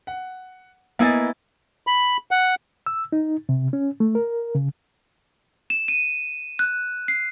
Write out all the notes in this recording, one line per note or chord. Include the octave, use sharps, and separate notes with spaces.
F#5
A#3 B3 E4 D#5 G#5 A6
B5
F#5
E6
D#4
C3
C#4
A3
A#4
C#3
E7
D#7
F#6
C7